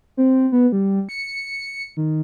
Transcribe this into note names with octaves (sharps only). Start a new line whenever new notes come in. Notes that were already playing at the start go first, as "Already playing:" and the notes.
C4
B3
G3
C#7
D#3